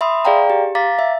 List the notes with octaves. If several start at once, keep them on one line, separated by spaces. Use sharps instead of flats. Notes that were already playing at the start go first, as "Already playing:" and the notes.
E5 B5 C6 D#6
G#4 D5 F5 G5 A#5
G4
F5 A#5 D6 A6 B6
E5